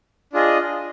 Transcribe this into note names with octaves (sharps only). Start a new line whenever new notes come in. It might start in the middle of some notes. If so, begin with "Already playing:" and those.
D4 F4 G#4 D#5